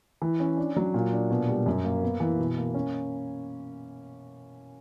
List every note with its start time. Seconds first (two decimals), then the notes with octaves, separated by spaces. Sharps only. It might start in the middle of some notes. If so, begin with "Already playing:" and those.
0.22 E3
0.40 C#4
0.57 D4
0.76 F#3
0.94 A#2
1.13 D4
1.30 B2
1.48 G3
1.66 F#2
1.84 A#3
2.03 B3
2.20 E3
2.39 B2
2.57 A#3
2.74 C#4